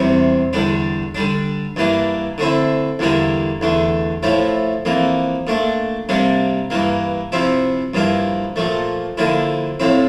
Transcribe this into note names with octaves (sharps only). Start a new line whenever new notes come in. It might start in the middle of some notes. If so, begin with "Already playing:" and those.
Already playing: E2 C3 G3 C4
E2 D3 G3 D4
D3 G3 D4
G2 E3 A#3 D4
D3 A3 C4 E4
E2 D3 G3 A#3 E4
E2 D3 A3
A2 F3 A3 E4
F2 E3 A#3
A#2 A3 D4
C3 G3 A#3 D4
G2 E3 A#3
C3 F3 C4 E4
G2 F3 A#3 E4
A#2 F3 A3
D3 F3 A#3 E4
A2 F3 C4 E4